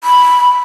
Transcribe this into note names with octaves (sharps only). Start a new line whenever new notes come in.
B5